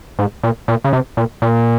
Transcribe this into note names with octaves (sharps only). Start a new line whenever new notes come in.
G#2
A#2
A#2
C#3
C3
A#2
A#2